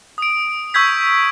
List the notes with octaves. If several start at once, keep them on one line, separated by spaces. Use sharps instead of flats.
D#6 D7
C#6 E6 G6 G#6 B6